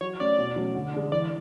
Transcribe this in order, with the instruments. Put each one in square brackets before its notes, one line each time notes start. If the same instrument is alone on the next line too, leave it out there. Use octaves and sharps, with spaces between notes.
[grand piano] F#3 [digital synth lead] C#5
[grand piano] A3 C#4 [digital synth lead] D5
[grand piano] B2
F#3 A3 C#4
D3
G#3 D4
[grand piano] E3 [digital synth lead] D5